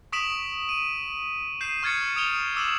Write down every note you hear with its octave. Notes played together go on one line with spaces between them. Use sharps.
C#6 D#6 B6 D7 E7 F#7
D#7
G6 C7 D#7 E7
C#6 F6 G#6 A6 C#7
D#6 A6 D7 F7 G7
D6 E6 E7 F#7